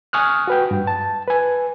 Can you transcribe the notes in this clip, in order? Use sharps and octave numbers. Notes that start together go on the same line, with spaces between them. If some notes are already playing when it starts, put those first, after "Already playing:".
G#5 C#6 D#6 F6 F#6
F#4 B4 G5
G2
A5
B4 G#5